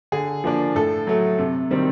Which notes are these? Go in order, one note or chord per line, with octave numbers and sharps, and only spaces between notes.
D3 G#4
F3 A#3 D4
A2 A4
F#3 A3
C3
D#3 G3 C4